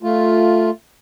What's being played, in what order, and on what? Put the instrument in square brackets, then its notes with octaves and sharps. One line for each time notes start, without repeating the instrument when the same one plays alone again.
[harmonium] A3 F4